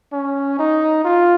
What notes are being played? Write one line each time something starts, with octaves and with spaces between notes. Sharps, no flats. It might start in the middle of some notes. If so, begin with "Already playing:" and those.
C#4
D#4
F4